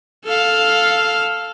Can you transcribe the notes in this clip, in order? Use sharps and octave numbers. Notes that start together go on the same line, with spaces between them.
A4 F5